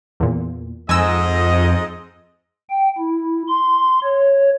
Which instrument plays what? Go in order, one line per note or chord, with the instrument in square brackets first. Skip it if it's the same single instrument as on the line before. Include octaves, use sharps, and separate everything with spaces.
[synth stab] E2 A#2
[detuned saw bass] F2 [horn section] G#2 D#5 [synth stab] G#5 E6
[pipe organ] G5
E4
C6
C#5